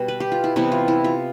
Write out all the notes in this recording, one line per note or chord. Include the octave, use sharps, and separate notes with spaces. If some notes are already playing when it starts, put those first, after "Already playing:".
Already playing: B2 G3
B4
G4
F4
E4
C3 E3 G3 B3 E4
F4
E4
F4